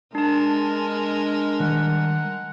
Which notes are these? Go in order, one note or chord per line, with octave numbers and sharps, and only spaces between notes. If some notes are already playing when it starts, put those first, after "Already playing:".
G#3 D4 A#4 A5
D#3 G3 F#5